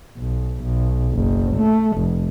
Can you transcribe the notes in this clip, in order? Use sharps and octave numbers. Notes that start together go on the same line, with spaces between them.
B1
B1
F#1
A3
F1